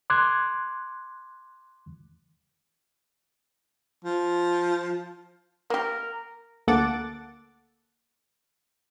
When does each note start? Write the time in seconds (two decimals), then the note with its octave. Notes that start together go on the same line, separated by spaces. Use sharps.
0.10 C6 D6 F#6 G#6
4.05 F3
5.70 A#3 G4 A#4
6.68 D2 A#3 A4 F#5 D6 A6